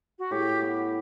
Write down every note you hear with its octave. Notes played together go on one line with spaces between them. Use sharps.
F#4
A2 G4
B3